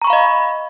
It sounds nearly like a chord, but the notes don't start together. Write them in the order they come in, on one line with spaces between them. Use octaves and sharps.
A#5 C#6 B5 F5 D#5